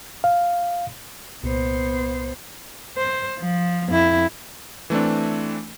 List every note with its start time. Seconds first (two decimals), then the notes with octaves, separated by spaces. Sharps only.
0.24 F5
1.44 C2 A#2 B3 C5
2.97 C5
3.40 F3
3.89 F2 E4
4.90 E3 A3 C4 D4